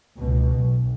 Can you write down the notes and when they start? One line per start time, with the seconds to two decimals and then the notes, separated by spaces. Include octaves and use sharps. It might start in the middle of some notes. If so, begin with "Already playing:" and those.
0.17 C#2 B2
0.56 B1